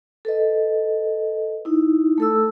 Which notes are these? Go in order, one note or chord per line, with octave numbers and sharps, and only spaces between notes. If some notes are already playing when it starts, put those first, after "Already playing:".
A4 B4 D#5
D#4 E4
A3 A4 E6